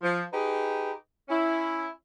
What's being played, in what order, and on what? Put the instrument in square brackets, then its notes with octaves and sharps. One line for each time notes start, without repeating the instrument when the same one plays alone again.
[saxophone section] F3
D#4 G4 G#4 B4
C#4 E4